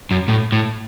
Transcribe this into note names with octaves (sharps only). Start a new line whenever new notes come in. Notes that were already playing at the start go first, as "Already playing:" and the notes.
F#2
A2
A2